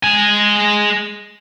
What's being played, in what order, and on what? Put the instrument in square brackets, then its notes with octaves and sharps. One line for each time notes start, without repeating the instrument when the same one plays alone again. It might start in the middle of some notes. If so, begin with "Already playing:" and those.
[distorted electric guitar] G#3 G#5